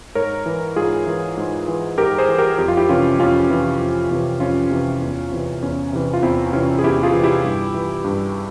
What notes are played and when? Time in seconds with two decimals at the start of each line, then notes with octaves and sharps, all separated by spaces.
0.15 G#2 A#4 C#5
0.46 E3
0.76 G#2 F4 G#4
1.07 E3
1.37 G#2
1.68 E3
1.98 G#2 G4 A#4
2.18 G#4 C5
2.28 E3
2.38 G4 A#4
2.59 F2 G4
2.68 F4
2.77 E4 G4
2.89 C3 E3 C#4 F4
3.19 F2 C#4 F4
3.49 C3 E3
3.80 F2
4.11 C3 E3
4.40 F2 C#4 F4
4.71 C3 E3
5.01 E2
5.32 C3 E3
5.62 E2 C#4
5.93 C3 E3
6.14 F4
6.23 E2 C4 E4
6.53 C3 E3 C#4 F4
6.79 G#4
6.83 E2 E4 G4
7.03 F4 G#4
7.14 C3 E3
7.23 E4 G4
7.44 G2
7.74 E3
8.04 G2